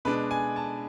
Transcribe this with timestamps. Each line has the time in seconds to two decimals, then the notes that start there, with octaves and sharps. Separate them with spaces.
0.05 B2 G#3 D4 B4
0.31 G#5
0.56 A5